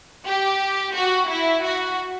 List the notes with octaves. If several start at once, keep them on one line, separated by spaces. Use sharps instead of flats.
G4
F#4
E4
F#4